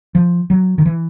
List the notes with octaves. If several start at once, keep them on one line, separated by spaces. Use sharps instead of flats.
F3
F#3
D#3
E3